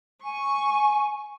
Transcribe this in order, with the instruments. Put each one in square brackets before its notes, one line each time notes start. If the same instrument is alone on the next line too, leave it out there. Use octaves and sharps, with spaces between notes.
[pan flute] G#5 [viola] C#6